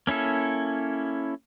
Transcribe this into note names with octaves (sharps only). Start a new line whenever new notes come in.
A#3 C#4 E4 A4